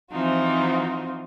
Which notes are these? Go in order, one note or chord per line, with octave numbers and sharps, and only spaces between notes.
E3 F3 C4 D#4 F4 F#4